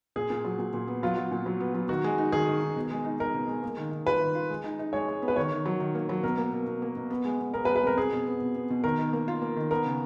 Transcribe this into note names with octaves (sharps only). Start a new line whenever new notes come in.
A#2 G#4
A#2
F#3
A#2
A#2
B3
F#3 F4
F#3
A#2
F#3
B3
F#3
D#3 F#4
G#3
D#4
D#3 G#4
D#3
D#3
B2
G#3
D#4
D#4 A#4
B2
G#3
A#3
D#3
D#3
F4 B4
D#3
F4
G#3
D#4
D#4
G#3 C#5
G#3
B3
B4
D#3 C#5
D#3
F#3
D#3
A#3
F#3
B2 A#4
A#3
B2
B2
A#3
B2
B3
G#3
B3
B3 A#4
B4
G#3
B4
F2 A#4
B2 G#4
B2
B3
B2
B3
B2
D#3 A#4
D#3
A#3
F4
A#3
D#3
B3 A#4
C#3